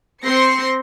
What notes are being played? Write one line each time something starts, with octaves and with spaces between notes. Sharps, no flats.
C4 C6 A#6 C7 C#7